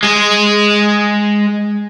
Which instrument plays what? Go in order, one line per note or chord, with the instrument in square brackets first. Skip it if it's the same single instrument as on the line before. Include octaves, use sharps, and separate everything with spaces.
[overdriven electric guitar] G#3 G#4